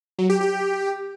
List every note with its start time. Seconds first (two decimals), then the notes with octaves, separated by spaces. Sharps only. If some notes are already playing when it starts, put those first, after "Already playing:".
0.19 F#3
0.30 G4
0.40 G4